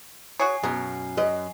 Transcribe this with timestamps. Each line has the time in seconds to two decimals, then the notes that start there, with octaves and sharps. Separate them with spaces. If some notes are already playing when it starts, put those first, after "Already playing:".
0.40 F#4 G#4 C#5 G#5 C7
0.63 F#2 B2 G#4 A#4
1.17 F#2 D#5